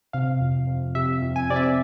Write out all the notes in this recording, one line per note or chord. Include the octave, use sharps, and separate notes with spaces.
C3 F5
F2
F2
C3 E5
F2
G#5
C3 D5
E5